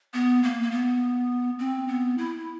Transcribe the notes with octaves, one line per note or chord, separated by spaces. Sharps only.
B3
A#3
A#3
B3
C4
B3
E4